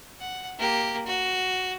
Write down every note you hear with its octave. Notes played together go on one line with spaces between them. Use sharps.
F#5
A#3 G4
F#4